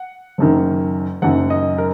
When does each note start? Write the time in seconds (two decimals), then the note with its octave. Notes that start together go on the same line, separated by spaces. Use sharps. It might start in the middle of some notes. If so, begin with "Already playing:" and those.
Already playing: F#5
0.38 F#1 F#2 D#3
1.22 F#1 F#2 D#3 F#5
1.50 D#5
1.78 A#4